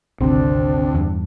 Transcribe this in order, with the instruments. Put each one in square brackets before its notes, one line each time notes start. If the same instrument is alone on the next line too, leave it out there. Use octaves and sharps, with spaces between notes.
[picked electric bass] G#1 C3 [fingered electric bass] D2 [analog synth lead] C4 [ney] D4
[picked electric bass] E2 G2